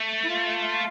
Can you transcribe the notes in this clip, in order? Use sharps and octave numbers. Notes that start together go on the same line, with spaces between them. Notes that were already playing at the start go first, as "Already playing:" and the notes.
Already playing: A3
E4
F4